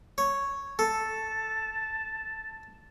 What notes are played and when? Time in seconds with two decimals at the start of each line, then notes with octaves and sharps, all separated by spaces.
0.18 C#5
0.79 A4 A5